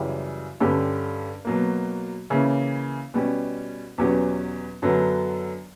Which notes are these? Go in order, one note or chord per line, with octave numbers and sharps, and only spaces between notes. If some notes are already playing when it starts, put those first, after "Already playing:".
Already playing: F#2 C#3 E3 G3
G2 D3 G3 C#4 G4
B2 F#3 A#3
C#3 E3 A#3 C#4 E4
B2 G3 C#4
E2 B2 F#3 C#4 G4
F#2 D3 F#3 B3